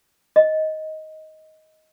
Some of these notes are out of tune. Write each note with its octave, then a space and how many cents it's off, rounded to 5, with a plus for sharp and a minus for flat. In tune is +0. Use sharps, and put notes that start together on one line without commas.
D#5 +10